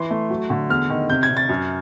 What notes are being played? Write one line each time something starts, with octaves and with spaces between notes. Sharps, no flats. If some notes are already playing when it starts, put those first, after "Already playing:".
Already playing: E3 C6
A3
F#3
D3
E2 F6
D#3
C3 G6
G#6
C3
A6
F#2